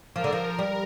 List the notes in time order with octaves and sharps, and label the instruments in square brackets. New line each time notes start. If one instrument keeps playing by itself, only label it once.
[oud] F3 [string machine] A#4
[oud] D3
F3
G3